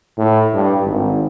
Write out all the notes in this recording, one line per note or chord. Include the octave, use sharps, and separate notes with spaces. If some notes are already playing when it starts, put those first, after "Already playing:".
A2
G2
G#1